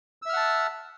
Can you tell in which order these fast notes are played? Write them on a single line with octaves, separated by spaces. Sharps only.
E6 E5 F6 F#5 A5